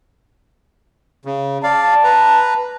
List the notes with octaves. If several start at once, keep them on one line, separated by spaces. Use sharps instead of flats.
C#3
D5 F5 A5
B4 A#5